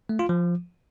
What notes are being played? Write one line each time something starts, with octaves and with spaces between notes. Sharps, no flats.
A3
F4
F3